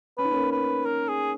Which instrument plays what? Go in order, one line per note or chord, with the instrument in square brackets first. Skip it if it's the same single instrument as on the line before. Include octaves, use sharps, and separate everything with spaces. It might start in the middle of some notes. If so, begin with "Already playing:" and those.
[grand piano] C#4 [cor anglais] B4
[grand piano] D#4
A#3 C#4
[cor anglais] B4
A#4
G#4